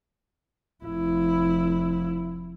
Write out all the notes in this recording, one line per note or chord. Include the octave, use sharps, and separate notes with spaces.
F1 E4